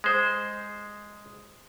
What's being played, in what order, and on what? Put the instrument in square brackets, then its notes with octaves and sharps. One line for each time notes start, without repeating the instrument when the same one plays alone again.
[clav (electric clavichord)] G#3 C5